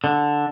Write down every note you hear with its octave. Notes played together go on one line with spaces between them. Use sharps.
D3